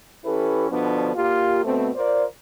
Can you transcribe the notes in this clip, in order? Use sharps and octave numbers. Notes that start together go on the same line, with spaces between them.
E3 C#4 E4 G4 A4 B4
B2 D3 F3 B3 D4
A#2 A#3 F4 G4
D2 B2 A3 B3 C4
F4 A#4 C5 D5